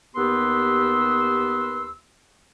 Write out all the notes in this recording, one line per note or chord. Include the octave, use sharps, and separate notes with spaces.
D#2 B3 G4 B4 C6 E6